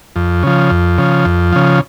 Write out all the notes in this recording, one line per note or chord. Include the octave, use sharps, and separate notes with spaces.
F2
C#3 F3
F2
C#3 F3
F2
C#3 F3